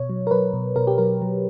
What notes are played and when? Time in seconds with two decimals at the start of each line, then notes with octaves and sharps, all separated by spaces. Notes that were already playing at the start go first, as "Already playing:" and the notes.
Already playing: B2 C#5
0.10 F#3
0.27 A#4
0.31 F#3 B4
0.53 B2
0.76 B2 A#4
0.87 G4
0.98 F#3 A#4
1.22 F#3